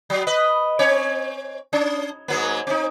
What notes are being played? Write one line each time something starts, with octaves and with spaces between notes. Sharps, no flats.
F#3
B4 D#5
C4 C#5
C#4
G#2 F#3 A#3
C4 D#4